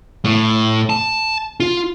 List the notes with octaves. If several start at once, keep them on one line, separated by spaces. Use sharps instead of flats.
A2
A5
F4